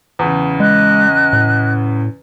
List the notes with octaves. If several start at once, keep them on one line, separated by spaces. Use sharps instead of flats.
E2 C#3
G#3 D#5 F#6
A2